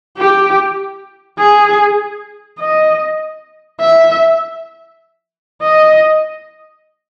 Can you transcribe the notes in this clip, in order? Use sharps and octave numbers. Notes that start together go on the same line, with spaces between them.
G4
G#4
D#5
E5
D#5